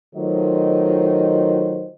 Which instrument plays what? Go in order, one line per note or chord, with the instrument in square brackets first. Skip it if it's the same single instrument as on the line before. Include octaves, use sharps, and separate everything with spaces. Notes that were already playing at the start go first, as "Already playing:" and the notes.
[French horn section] D#3 F#3 A3 F4 C5 D#5